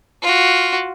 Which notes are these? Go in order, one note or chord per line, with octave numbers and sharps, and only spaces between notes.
F4 F#4